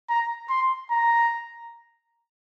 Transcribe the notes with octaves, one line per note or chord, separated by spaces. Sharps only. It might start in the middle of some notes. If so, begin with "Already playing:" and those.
A#5
C6
A#5